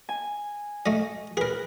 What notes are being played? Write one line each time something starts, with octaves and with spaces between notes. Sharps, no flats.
G#5
A3 D#5
G#4 A#4 B4